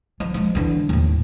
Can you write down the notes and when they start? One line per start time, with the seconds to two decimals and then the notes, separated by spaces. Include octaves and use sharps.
0.20 F3
0.34 F3 G#3
0.55 D3 E3
0.89 D#2 A2